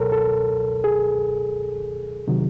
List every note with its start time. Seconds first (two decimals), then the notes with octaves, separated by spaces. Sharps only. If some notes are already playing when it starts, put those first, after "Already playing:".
Already playing: C#2 B2 F#3 A4 A#4 C#5
0.12 A4
0.84 G#4
2.28 C3 D#3 F#3